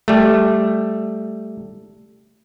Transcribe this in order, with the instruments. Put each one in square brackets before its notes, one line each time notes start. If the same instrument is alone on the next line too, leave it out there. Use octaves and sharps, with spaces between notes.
[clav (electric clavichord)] G3 A3